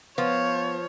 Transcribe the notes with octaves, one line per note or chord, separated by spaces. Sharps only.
F3 B3 C#5 C6